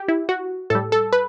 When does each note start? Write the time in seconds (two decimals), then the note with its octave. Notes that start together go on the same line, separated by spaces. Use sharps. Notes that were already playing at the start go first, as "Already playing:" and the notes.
Already playing: G4
0.08 E4
0.29 F#4
0.70 A2 G3 A4
0.92 A4
1.13 B4